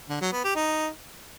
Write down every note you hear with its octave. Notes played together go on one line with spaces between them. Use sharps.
D3
F#3
B3
G4
D#4